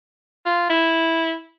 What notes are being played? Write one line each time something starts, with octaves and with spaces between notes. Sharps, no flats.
F4
E4